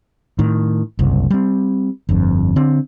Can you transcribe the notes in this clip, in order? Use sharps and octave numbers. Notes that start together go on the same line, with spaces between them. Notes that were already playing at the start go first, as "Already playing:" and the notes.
A2 D#3
F#1 C2
G3 C4
G1 F2
D3 C4